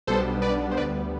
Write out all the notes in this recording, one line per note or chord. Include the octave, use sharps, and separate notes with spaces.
B1 B2 G3 B3 D4 A4 C5
B4 D5
C5
D2 D3 G3 B3 B4 D5